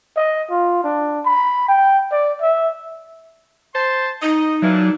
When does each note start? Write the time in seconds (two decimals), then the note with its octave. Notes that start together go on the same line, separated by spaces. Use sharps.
0.17 D#5
0.50 F4
0.84 D4
1.25 B5
1.68 G5
2.11 D5
2.41 E5
3.74 C5 A5 C6
4.22 D#4 D#5
4.62 A#2 E3 F#3 D4